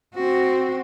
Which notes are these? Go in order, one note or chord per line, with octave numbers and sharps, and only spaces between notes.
C4 F#4